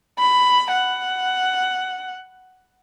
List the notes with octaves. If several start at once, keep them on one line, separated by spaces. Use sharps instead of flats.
B5
F#5